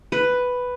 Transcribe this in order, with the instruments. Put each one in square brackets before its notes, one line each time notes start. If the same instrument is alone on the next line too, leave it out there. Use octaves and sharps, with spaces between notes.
[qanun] B4